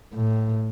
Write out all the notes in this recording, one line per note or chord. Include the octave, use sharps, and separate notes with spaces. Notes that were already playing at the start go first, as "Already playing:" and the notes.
A2